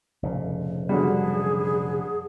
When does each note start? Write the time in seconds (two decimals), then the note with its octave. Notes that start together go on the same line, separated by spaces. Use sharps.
0.23 F1 A#2 C#3
0.89 D3 F#3 G3 G#4